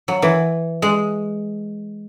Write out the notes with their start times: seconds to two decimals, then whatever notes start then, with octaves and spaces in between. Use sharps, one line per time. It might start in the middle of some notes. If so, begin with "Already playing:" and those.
0.08 F#3
0.22 E3
0.82 G#3